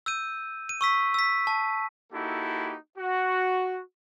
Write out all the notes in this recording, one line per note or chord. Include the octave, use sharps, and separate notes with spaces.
E6 G6 D#7
D#7
C#6 E6 B6
E6 B6
A5
A#3 D#4 E4 F#4 G4 A4
F#4